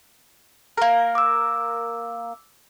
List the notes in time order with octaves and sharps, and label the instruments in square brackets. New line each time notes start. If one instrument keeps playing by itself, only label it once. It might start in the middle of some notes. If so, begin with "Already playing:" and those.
[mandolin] A#3 A#4
[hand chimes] D6 E6